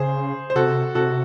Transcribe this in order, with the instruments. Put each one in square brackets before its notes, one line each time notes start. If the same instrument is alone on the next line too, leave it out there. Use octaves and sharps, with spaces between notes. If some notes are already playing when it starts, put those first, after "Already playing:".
Already playing: [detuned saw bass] C#3 [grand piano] G#4 C5
[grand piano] C5
[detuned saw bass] C3 [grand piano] F#4 A4
[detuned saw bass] C3 [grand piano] F#4 A4